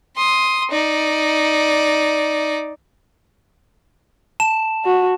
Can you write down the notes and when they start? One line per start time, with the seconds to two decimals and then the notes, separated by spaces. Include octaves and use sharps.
0.16 C6 D#6
0.71 D#4 D5
4.40 A5 E7
4.85 F#4